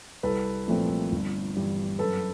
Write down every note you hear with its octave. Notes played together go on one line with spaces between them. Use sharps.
C2 A4 B4
A#2 F3 A3 C4
G1
G2 E3 G3
F#2 A4 B4